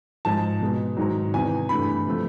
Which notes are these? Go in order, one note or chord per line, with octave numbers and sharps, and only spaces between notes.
G#2 F3 G#3 A5
B2 G#3
G#2 D#3 F#3
E2 C3 E3 G#5
G2 E3 A3 B5
C3 F3 A3